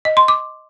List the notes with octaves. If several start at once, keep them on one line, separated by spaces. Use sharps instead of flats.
D#5
C6
D6